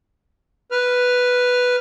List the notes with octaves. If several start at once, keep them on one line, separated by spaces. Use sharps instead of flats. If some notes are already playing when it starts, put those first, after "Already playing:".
B4 F6